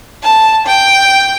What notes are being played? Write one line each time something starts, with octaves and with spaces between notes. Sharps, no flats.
A5
G5